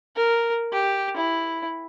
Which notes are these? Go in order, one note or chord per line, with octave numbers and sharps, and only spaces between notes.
A#4
G4
E4